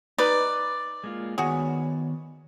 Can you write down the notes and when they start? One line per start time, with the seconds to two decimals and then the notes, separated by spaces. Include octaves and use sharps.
0.18 D#4 B4 D5
1.04 G#3 A#3 F4
1.38 D#3 B3 F#4 G#4 C#5